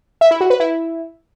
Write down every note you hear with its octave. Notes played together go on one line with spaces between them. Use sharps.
E5
E4
F#4
B4
E4